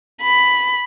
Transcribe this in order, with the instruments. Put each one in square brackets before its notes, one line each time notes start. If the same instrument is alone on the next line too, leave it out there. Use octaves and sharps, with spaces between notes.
[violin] B5